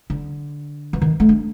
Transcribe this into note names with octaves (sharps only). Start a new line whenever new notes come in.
D3
E3
D#3
A3
D4